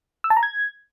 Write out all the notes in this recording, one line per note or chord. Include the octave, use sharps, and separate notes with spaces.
E6
A5
A#5
G#6